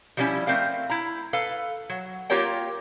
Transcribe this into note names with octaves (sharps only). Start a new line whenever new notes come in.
F3 G3 A3 A#3 C#4 E4
A3 C4 A#4 F5
E4 A#5
A4 B4 F5
F#3
A#3 F4 G4 A#4 C#5 G5